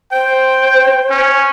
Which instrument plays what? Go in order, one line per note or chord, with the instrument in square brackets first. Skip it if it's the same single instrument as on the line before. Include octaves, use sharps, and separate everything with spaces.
[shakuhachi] C5 [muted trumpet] G5
[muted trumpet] C#4